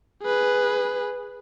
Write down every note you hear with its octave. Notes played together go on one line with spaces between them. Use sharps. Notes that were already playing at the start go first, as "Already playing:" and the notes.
G#4 B4